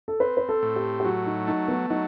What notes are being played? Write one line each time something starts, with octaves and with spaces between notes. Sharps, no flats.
A4
C4 B4
B4
A4
A2
G4
G4
F#3 F#4
D#4
A3 D#4
B3
F#3 D#4